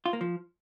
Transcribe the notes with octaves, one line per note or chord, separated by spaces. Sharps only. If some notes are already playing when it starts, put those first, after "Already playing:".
F4
A#3
F3